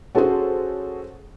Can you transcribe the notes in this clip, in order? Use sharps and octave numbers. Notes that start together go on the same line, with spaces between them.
C#4 F#4 G#4 A4 C5